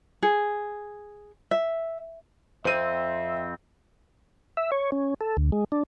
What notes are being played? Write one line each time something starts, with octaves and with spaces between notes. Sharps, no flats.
G#4
E5
F2 C4 C5 E5 D#7
E5
C#5
C#4
A4
D2
G#3
D4